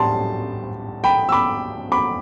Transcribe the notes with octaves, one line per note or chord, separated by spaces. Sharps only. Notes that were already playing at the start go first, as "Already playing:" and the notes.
Already playing: A2 G3 D4 A5 C6
G5 B5
E6
B5 D6
B5 D6